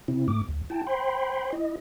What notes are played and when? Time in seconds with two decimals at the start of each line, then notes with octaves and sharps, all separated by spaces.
0.08 C3 C4 E4
0.28 G#2 A3 D6
0.48 D2
0.70 E4 G5 A5
0.87 C5 G5 B5 C6
1.53 E4 D#5